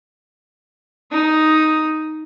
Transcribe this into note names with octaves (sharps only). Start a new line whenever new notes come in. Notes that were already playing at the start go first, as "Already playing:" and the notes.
D#4 D#6